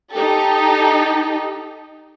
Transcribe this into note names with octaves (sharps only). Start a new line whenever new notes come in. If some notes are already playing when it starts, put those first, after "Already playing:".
D#4 G4 A4